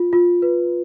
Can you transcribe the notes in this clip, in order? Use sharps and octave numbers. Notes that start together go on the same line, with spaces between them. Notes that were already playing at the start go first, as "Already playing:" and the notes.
Already playing: F4
F4
B4